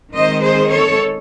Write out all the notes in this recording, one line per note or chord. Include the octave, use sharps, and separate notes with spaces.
D#3 G#3 C4 D#4 C5 D#5
G#4 C5
A4 C#5